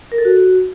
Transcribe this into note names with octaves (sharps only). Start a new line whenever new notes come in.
A#4
A4
F#4